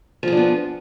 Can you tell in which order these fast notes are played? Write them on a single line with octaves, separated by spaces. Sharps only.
F3 G#4 D4 B3